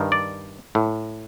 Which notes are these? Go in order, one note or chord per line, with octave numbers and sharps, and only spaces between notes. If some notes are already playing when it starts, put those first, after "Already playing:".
Already playing: G2 D#3
D5
A2